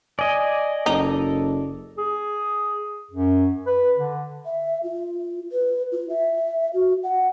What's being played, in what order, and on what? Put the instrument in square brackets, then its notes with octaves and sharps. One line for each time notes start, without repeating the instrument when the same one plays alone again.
[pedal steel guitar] D5 D#5 [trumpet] G#5
[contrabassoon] F#1 [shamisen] D#4 [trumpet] A4
[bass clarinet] G#4
F#2
B4
D3
[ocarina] E5
F4
B4
F4
E5
F#4
F#5